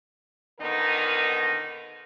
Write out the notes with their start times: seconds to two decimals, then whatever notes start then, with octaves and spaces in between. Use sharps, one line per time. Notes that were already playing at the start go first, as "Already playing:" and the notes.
0.60 A#2 D3 D#3 B3 D#4 A#4